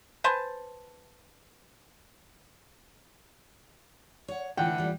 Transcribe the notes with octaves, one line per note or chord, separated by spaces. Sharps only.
B4 C5 G#5 A5
C#5 F#5
A2 D3 E3 D4 F#5 G5
G3 F4